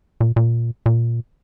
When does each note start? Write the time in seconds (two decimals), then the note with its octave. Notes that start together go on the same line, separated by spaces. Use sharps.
0.21 A#2
0.36 A#2
0.86 A#2